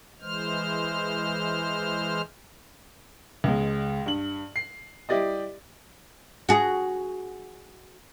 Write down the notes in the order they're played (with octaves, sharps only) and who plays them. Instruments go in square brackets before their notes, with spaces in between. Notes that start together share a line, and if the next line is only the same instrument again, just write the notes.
[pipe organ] E3 G#3 C5 F6
[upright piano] C#2 G#3
G2 F#7
C7
G3 E4 G4 D5 D#5
[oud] F#4 G#4